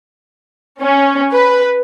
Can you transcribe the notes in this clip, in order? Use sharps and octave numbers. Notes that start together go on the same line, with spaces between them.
C#4
B4